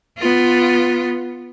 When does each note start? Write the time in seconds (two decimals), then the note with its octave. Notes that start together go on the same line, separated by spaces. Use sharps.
0.18 B3 F4